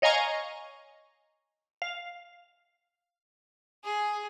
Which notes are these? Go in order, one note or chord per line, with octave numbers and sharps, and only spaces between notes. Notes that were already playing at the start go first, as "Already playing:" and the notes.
C#5 D#5 F5 G#5 A#5 C#6
F5
G#4